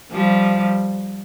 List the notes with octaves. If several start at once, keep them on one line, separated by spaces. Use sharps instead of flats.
F3 G3